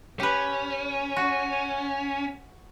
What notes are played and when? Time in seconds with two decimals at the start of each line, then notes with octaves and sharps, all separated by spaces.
0.20 C#4 G4 B4
1.16 F#4